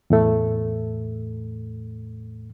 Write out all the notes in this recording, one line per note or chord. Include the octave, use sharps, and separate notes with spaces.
E2 A2 A3